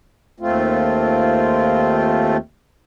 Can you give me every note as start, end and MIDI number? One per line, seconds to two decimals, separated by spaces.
0.40 2.37 39
0.40 2.37 57
0.40 2.37 60
0.40 2.37 65